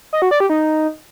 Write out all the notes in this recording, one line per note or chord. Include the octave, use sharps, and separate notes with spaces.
D#5
F#4
D5
G4
D#4